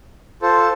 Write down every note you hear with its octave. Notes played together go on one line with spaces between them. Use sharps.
F4 A4 C5